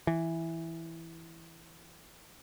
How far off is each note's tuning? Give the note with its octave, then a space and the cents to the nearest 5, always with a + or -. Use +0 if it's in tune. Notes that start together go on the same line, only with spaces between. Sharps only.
E3 +0